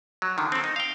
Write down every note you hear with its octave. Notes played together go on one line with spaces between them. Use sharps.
F#3
D3 D#3
C4 A4
D#4
F5 G5